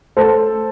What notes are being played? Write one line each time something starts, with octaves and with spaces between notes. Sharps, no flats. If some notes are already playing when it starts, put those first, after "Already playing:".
A3 A4 C5